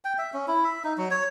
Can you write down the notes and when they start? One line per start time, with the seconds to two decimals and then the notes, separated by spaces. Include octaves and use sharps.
0.05 G5
0.18 E5
0.34 C#4
0.48 E4
0.64 E5
0.84 D#4
0.98 F#3
1.11 C#5